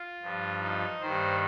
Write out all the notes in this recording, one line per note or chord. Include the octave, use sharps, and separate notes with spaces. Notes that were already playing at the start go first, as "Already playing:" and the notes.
Already playing: F4
G2 F3
D#4
G2 D#3 C5